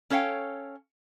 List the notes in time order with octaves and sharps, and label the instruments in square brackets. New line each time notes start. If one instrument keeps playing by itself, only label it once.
[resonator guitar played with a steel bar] C#4 A4 C#5 F5 G5